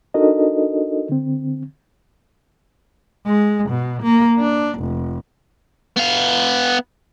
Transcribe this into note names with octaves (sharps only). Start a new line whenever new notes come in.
D4 D#4 F#4 A4 A#4 D#5
D3 C4
G#3
B2
A#3
D4
F1
B3 F5